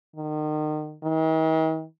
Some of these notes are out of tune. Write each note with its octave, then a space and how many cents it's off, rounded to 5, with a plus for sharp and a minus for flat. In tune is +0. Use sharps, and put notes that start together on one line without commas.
D#3 -35
D#3 +45